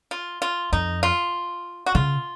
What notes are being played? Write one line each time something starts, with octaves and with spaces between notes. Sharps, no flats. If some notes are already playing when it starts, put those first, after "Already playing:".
F4
F4
F2 D#4
F4
F#4
C#3 F4